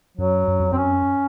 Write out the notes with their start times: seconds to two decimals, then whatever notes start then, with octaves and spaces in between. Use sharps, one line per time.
0.17 F#2 F#3
0.48 F#2
0.60 F2
0.72 F#2 C4
0.77 C#4